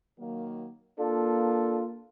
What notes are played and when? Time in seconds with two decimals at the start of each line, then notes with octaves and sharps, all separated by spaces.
0.19 D#3 F#3 A#3
0.99 A#3 D4 F4 A4